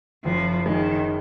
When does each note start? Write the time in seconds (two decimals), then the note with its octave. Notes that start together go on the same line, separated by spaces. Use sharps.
0.25 F#1 F3
0.66 D#3 G#3